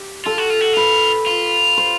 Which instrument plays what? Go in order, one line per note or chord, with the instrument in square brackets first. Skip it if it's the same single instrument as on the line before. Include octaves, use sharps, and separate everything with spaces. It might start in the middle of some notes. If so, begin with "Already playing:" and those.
Already playing: [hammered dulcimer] G4
[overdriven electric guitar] F4 [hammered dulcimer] A4
[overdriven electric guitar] F#4
F4
F#4
[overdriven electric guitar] F4 [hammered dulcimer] B4
[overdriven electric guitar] F4
[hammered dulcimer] C5